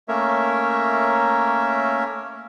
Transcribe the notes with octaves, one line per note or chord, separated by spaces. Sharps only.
A3 A#3 C#4 A#4 C#5 E5